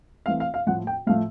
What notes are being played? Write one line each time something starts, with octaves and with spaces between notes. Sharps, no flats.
E3 A3 C4 F5
F5
F5
A2 F3 A3 F#5
G5
A2 F3 A3 F5